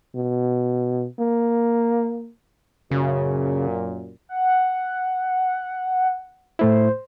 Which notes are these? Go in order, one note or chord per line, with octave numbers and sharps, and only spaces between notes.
B2
A#3
F#2 A#2 C#3
F#5
A2 A3 E4 C5